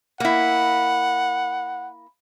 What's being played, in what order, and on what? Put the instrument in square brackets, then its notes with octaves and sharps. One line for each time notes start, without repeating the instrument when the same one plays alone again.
[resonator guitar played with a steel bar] A#3 E4 [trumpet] F#5